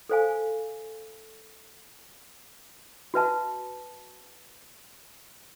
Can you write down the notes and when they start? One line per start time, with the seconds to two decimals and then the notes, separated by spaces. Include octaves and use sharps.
0.09 A4 C5 F5 G#5
3.14 F#4 B4 E5 A5